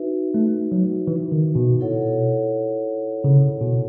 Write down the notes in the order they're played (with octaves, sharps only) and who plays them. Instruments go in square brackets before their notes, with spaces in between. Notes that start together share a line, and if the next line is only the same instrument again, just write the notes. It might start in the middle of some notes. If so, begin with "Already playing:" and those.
Already playing: [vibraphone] D#4 F#4 B4 E5
[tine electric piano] A3
F#3
E3
D#3
B2
[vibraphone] E4 A4 C#5 F#5
[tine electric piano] C#3
B2